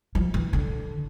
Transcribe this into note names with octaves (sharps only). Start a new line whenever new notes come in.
F3
E3
D3